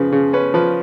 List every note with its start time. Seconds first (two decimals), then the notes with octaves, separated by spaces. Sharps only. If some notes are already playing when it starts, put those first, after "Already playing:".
Already playing: C#3 F3 B4
0.12 C#3
0.33 C#4 B4
0.54 F3 B4